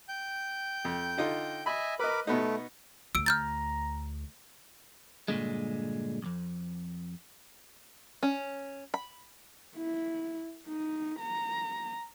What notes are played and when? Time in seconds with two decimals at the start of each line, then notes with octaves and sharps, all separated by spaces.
0.08 G5 G6
0.85 F2
1.18 D3 D#4 F4
1.66 D#5 E5 G#5 B5
1.99 A#4 B4 D#5 B5 D6
2.27 B2 A3 B3 D#4
3.15 D2 E6 D7
3.26 A#5 F6 G6 A6
5.28 G2 A#2 D3 G#3
6.22 B1 F2
8.23 C#4
8.94 B5
9.76 E4
10.68 D#4
11.19 A#5